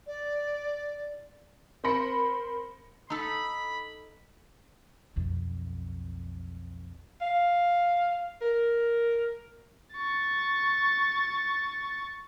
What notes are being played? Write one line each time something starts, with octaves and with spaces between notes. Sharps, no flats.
D5
C4 A#4 C5 B5 A#6 C#7
D#4 A4 B5
B1 F2
F5
A#4
C#6 A6